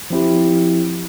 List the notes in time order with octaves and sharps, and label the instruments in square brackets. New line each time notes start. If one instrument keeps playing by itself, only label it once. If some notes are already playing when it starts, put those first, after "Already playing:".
[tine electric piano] F3 C4 E4 G4